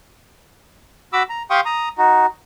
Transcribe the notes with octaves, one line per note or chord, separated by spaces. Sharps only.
F#4 B5 D6 E6
A#5
G4 F5 G5 C6 C#6 D#6
A#5 D#6
D#4 F#4